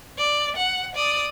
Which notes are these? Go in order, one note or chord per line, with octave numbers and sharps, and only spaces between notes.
D5
F#5
D5 D#6